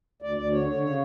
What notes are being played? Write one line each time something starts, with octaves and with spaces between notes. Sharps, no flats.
D2 D5
D2 D5
D3 C#5
D3 C#5
C#3 C#5